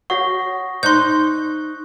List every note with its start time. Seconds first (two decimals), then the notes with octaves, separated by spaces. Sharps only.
0.10 F#4 C#5 F#5 C#6 D#6 A#6
0.83 D#4 C5 C6 F#6 G6